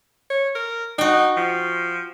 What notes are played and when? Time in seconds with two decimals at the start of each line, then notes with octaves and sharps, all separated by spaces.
0.30 C#5
0.55 A#4
0.98 D#4 F#4 G5
1.37 F3